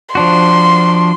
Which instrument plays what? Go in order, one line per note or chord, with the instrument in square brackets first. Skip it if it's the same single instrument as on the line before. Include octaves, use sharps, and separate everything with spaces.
[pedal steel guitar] F3 D4 F#4 [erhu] C6